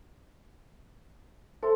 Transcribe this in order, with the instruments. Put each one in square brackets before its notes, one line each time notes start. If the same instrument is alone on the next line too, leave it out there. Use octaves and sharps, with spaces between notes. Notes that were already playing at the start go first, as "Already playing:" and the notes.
[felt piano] A4 [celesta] C5 E5 C6